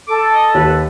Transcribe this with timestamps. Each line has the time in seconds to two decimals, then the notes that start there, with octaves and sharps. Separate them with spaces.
0.08 A4 D6
0.34 D#5
0.54 D#2 B4